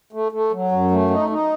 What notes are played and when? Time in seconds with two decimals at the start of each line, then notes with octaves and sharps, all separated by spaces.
0.13 A3
0.32 A3
0.52 F#3
0.72 F#2
0.91 A3
1.10 D#4
1.30 D#4